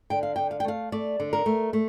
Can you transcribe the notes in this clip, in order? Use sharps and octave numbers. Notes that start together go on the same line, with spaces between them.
D3 G5
F5
D3 G5
F5
G5
A3 F5
A3 D5
D3
A#4
A3
A3